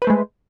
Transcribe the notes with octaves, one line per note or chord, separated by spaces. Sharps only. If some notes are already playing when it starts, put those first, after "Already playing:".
G#3 A3 B4 C5